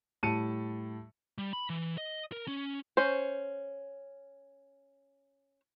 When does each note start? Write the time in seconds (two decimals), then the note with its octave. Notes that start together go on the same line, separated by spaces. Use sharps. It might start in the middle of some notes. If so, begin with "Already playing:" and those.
0.23 A2 G3 A5 C#7 D#7
1.38 G3
1.53 B5
1.70 E3
1.98 D#5
2.32 A#4
2.48 C#4
2.97 C#4 C5